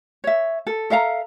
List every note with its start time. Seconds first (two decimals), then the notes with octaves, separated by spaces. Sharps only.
0.24 C#5 E5
0.67 A4
0.90 A4 E5 F5 A#5